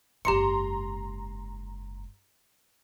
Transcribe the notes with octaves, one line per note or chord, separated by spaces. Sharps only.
F#1 G#2 G4 A#5 C6 C#7